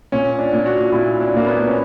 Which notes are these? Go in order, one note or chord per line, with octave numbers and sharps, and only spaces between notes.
A#2 C#4
D4
A#2
F#4
A#2 E4
D4
A#2 A#3
B3
C#4